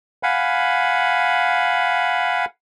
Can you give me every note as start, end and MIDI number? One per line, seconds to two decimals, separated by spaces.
0.23 2.45 77
0.23 2.45 78
0.23 2.45 80
0.23 2.45 83